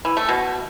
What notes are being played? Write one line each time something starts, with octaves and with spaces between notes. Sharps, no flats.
E3
A3
B2